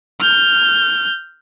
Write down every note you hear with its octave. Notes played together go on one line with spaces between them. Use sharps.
F6 G6